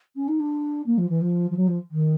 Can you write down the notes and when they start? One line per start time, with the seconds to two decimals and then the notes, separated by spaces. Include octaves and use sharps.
0.15 C#4
0.28 D#4
0.39 D4
0.86 A#3
0.97 F3
1.09 E3
1.21 F3
1.50 F3
1.56 F#3
1.67 F3
1.91 D#3